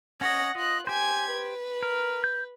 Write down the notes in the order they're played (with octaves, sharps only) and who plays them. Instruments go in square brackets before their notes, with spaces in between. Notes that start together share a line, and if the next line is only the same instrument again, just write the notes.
[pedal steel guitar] C#4 C#5 D#5 [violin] F#5 A#6
[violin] F4 F#6 [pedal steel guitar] D#5
[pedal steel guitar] G4 C5 [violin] G#5 G#6
[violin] B4
[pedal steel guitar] A#4
G6